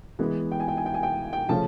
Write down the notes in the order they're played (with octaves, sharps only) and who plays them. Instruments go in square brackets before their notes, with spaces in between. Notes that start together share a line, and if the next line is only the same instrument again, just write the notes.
[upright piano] E3 G#3 B3
G5
G#5
G5
G#5
G5
G#5
G5
G5
C#3 F3 A3 C#4 A5